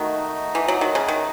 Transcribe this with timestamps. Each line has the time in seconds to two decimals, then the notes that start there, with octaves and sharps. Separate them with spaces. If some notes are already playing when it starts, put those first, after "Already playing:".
Already playing: D#3 A3 D#4 F#4
0.55 E3
0.68 F#3
0.81 D#3
0.95 C#3
1.08 D#3